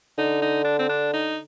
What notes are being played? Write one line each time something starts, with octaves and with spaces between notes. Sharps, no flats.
D3 D#4
D#4
D4
C4
D4
D#4